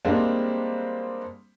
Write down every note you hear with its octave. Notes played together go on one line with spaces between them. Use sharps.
G3 G#3 A#3 C4 D4